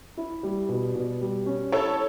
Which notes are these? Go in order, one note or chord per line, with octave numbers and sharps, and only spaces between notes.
E4
G3
B2
B2
G3
C#4
E4 A4 C#5